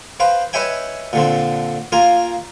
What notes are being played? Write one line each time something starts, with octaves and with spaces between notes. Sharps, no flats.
B4 C5 F5 G5
B4 C#5 D#5 E5 G5 G#5
A#2 D3 C4
A#3 F4 A#4 G#5 A#5